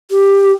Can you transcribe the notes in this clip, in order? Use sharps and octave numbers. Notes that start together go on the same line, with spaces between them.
G4